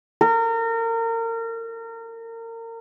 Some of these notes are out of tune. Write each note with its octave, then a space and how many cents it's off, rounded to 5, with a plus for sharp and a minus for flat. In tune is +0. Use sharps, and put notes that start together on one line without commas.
A#4 -30